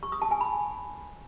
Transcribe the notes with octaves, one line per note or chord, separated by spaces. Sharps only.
C#6
D#6
A5
G#5
B5